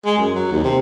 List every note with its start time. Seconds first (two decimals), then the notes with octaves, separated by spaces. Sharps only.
0.05 G#3
0.18 F#2
0.35 F#3
0.51 D#2
0.64 C3